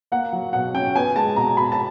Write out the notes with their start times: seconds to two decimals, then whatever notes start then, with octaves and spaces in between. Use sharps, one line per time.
0.12 A#3 F#5
0.33 F#3
0.53 B2 F#5
0.74 C#4 G5
0.96 B3 G#5
1.16 G#3 A5
1.36 B2 A#5
1.57 B2 B5
1.72 A5